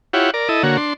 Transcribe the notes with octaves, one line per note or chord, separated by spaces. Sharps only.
E4 F4 G4 C#5 F#5
A#4 D5
E4 A4 D#5
D3 A#3 F#4 C#5
D4 C6